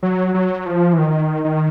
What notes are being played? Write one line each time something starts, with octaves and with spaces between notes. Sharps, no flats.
F#3
F#3
F3
E3
D#3
D#3